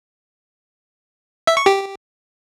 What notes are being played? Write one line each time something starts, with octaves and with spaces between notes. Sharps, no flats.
E5
C#6
G4